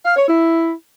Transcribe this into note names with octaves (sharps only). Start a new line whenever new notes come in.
F5
C#5
E4